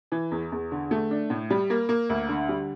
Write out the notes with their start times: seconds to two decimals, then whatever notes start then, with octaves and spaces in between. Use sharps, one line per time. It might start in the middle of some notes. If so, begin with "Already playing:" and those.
0.12 E3
0.31 E2
0.52 E2
0.71 D3
0.91 A3
1.11 D4
1.30 A2
1.50 G3
1.70 A#3
1.89 A#3
2.10 D2
2.29 D3
2.49 G3